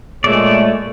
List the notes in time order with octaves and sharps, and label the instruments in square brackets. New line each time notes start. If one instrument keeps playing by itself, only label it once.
[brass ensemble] A#2 G#3 C#5 [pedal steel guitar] A3 D5